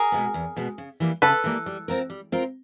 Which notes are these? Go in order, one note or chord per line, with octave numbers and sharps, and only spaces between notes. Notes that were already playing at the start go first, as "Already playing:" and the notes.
Already playing: G#4 A#4
B2 G#3 B3
E2
B2 G#3 B3
C#3
E3 G3 A#3
C#3 A4 B4
E3 G3 A#3
G3
C4 F4 A#4
G3
C4 F4 A#4